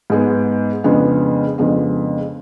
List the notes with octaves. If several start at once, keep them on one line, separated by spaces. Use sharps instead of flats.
G#2 G#3 B3
F2 C#3 G#3 B3 D4
F2 C#3 G#3 B3 D4